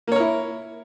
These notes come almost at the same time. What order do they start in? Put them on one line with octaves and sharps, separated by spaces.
A#3 C#5 A#4 E4